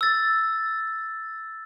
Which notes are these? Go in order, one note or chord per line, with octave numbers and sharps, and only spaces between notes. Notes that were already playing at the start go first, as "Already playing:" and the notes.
E6 A6